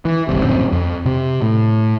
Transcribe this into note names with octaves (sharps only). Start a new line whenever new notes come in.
E3
G1 C2 C3
D1 A#1 F#2 C4
F2
C3
A2